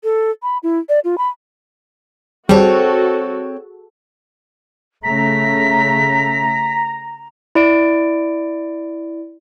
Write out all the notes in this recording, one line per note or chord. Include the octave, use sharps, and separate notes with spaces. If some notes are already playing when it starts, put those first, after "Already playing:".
A4
B5
E4
D5
F4
B5
G3 C4 F#4 G#4 A4 C#5 A5
C#3 A3 A#5 B6
E4 D5 D7